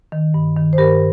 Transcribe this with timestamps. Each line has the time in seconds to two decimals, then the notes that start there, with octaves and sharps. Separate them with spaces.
0.12 D#3
0.34 G2
0.57 D#3
0.73 C5
0.78 G2 G4 A#4